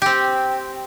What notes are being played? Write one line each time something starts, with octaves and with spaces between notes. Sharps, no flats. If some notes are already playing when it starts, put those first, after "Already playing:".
C4 G4